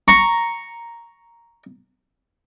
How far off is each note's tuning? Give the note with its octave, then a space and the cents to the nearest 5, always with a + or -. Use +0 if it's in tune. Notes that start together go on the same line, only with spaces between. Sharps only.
A#5 +0 C#6 +0